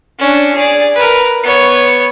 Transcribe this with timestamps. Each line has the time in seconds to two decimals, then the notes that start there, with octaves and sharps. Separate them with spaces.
0.19 C#4 D4
0.56 G#4 D5
0.95 A#4 B4
1.43 B3 C#5